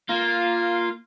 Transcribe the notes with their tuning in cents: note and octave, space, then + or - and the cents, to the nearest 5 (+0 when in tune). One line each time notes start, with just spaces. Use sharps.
A#3 +0 F4 -5